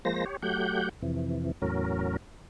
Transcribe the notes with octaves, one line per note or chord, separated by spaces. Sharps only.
F3 G#3 A#3 C5 A#6
G4 C#5
F#3 A3 G4 F#5 G6
F2 C3 E3
E2 A2 F#3 C#4 A#4